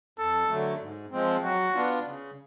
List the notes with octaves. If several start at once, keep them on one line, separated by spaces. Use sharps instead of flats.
F2 A4
D3 F#3 A3
G#2
F3 G#3 C4
F#3 F#4
B3 D4 F4
C#3